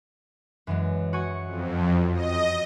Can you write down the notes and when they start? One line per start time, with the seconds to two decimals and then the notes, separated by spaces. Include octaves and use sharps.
0.67 F#2 E3 G#3
1.13 F#4 G#5 C#6
1.47 F2
2.14 D#5